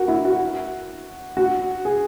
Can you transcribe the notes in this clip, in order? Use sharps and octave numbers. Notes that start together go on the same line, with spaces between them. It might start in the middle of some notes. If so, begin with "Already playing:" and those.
Already playing: F#4 A#4
E4
F#4
F#4
G#4